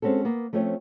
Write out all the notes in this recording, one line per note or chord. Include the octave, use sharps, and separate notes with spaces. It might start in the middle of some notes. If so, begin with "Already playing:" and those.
G#3 C4 C#4 F#4 A4
A#3 B3
F3 A3 C4 C#4 C#5